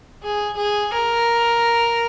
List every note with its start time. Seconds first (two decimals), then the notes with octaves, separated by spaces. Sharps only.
0.23 G#4
0.57 G#4
0.93 A#4